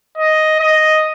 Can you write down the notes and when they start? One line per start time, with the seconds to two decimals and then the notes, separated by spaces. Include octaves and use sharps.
0.18 D#5
0.60 D#5